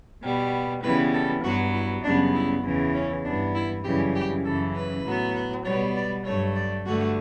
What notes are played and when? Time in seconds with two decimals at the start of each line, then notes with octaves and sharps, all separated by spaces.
0.23 B2 G3 B3
0.83 C#3 E3 G3 B3 B4
1.14 A4
1.44 G2 F#3 B3 F#4
1.74 E4
2.04 F#2 C#3 G3 B3 D4
2.34 E4
2.64 E2 C#3 E3
2.94 C#4
3.25 G2 E3 B3 D4
3.55 E4
3.85 F#2 C#3 E3 G3 G4
4.15 G4
4.45 F#2 C#3 E3 A4
4.75 B4
5.06 A2 F#3 B3
5.65 B2 G3 B3 C#5
5.96 D5
6.26 G2 F#3 A3 C#5
6.56 D5
6.86 G2 D3 A3 F#4